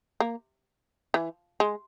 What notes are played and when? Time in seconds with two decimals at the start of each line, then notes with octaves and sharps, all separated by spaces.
0.20 A#3
1.14 E3
1.60 G#3